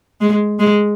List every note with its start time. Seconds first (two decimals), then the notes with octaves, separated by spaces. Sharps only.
0.21 G#3
0.59 G#3